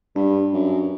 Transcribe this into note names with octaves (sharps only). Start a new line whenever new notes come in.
G2 D4
F#2